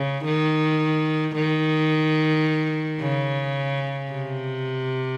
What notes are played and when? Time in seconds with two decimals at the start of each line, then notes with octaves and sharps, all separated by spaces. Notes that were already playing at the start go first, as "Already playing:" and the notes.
Already playing: C#3
0.25 D#3
1.35 D#3
3.01 C#3
4.11 C3